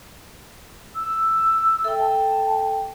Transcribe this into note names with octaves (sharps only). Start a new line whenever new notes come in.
E6
A4 E5 G5
A5